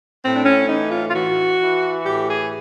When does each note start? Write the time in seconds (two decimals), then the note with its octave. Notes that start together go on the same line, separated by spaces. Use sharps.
0.23 A2 C4
0.35 D4
0.45 C#4
0.69 E3 D#4
0.91 F4
1.09 F4
1.14 E3 F#4
1.60 E3
2.05 A2 G4
2.28 G#4